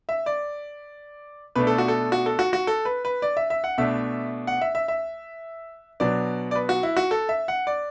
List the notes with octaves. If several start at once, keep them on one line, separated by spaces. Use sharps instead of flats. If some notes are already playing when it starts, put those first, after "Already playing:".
E5
D5
B2 A3 D4 B4
A4
F#4
A4
F#4
A4
F#4
F#4
A4
B4
B4
D5
E5
E5
F#5
B2 A3 D4 E5
F#5
E5
E5
E5
B2 F#3 B3 D4 D5
D5
B4
F#4
E4
F#4
A4
E5
F#5
D5